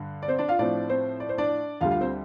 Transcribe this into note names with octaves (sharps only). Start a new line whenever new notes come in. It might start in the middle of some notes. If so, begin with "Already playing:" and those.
Already playing: G2 D3
D5
C4 C5
D4 D5
F4 F5
A2 F3 C4 D4 D5
C4 C5
D5
C5
D4 D5
D2 D3 G3 F4 F5
F4 F5
C4 C5